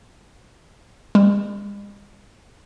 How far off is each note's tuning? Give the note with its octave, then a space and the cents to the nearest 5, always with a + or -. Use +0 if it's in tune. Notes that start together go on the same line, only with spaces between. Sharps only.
G#3 -45